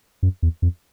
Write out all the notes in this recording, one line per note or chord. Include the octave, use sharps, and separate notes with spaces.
F#2
E2
F2